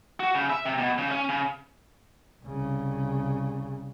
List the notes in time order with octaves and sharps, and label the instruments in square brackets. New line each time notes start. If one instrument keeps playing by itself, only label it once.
[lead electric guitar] F#4
C#3
E5
C3
B2
C#3
C#4
C#3
[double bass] C2 C#3